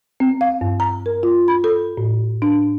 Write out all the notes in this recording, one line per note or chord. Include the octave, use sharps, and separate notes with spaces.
C4
F5
G2
A#5
A#4
F4
B5
A4
A2
D4